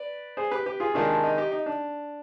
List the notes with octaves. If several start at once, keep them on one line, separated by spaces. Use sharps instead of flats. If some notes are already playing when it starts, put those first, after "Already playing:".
Already playing: B4 D5
G#4 C5
G4 B4
G4 B4
F4 G#4
C3 D#3 G#3 D4 F4
D4
D#4
D#4 G4
D#4
D4